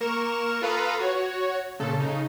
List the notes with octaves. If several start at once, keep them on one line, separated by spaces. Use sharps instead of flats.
A#3 A#4 C#6 E7
F4 A4 B4 F5 A#5 D#6
F#4 C#5
A#2 C#3 A4
C#3 D#4